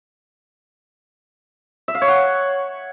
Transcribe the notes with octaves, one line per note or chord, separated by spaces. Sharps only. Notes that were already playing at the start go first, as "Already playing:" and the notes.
E5
F5
C#5
F#5